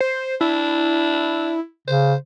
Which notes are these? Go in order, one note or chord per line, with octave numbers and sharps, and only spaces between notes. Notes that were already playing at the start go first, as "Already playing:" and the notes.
C5
D4 E4
C#3 C5